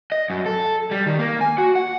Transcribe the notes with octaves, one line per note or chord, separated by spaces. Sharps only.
D#5
F#2
A4
G3
D#3
A#3
G#5
F#4
F#5